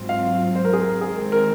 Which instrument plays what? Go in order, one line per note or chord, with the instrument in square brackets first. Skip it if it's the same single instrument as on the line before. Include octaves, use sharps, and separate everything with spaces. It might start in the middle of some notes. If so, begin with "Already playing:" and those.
Already playing: [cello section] G#2 F#3 C4 F4
[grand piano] F5
C5
A#4
G#4
A#4
[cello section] D#3 G#3 C4 [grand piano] G#4
[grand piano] A#4